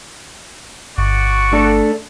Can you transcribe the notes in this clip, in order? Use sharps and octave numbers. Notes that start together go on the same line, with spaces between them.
G1 F#4 D5 C#6
A3 D4 A4